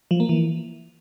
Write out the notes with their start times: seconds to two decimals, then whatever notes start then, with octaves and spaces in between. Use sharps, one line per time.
0.11 F3
0.20 A#3
0.29 E3